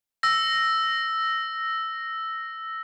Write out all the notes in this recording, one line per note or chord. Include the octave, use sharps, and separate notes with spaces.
E6 A#6